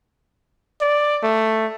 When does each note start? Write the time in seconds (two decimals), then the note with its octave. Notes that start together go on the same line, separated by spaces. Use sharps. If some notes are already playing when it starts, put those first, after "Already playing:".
0.81 D5
1.23 A3